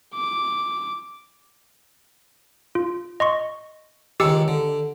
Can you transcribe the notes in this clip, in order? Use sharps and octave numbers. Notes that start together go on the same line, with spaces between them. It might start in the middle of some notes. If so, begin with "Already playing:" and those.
D6
F4
D#5 C6 C#6
C#2 D#3 G#3 G4 E6 C#7
D3